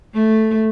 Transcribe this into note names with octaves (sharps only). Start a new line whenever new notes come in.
A3